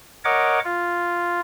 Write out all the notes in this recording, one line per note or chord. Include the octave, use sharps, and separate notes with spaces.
A#4 C#5 D#5 F#5 D6
F4